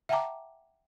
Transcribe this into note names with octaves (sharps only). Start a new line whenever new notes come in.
E5 F#5 G5 A5 A#5 D6